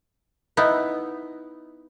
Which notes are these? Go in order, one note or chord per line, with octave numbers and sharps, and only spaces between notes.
B3 D#4 E4